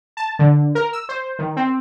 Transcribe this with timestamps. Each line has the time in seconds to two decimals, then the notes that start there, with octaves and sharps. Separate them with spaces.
0.17 A5
0.39 D3
0.75 A#4
0.93 E6
1.09 C5
1.39 D#3
1.57 C4